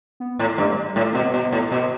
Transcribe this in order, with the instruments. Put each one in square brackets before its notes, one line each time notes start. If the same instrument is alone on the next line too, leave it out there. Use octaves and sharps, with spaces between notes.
[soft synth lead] B3
[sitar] A2
[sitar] G2 [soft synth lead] A3
[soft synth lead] G3
[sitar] A2 [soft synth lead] A3
[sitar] B2 [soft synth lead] C4
[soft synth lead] B3
[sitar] B2
[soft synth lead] B3
[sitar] A2
[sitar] B2 [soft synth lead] B3